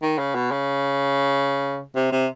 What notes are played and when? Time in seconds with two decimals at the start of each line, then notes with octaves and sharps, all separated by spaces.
0.02 D#3
0.18 C#3
0.35 B2
0.51 C#3
1.96 C3
2.12 C3